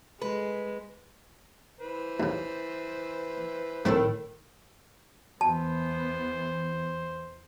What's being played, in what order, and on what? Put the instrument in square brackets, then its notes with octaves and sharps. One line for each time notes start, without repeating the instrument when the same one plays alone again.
[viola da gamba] G#3 [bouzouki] B4
[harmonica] E3 B4 C5
[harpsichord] D#2 C#3
[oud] A2 D#3 [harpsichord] A3 C4 A4
[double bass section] E2 E3 [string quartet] B3 [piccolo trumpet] C5 [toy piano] A5